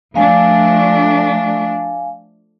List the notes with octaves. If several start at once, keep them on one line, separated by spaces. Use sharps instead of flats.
F3 A3 D4 F5 G#5